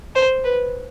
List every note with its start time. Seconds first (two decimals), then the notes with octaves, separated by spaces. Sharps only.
0.15 C5
0.44 B4